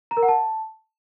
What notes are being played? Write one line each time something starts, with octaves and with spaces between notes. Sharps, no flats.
A#5
A#4
F#5
A5